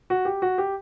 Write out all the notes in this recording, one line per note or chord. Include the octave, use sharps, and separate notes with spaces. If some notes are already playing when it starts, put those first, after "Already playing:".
F#4
G4
F#4
G4